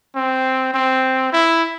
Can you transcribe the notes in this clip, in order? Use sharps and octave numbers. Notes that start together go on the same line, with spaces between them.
C4
C4
E4